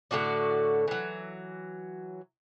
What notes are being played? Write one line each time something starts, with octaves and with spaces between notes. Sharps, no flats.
A2 D3 F#4 D5
E3 F#3